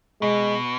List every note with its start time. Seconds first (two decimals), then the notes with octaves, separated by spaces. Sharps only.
0.22 B2 G#3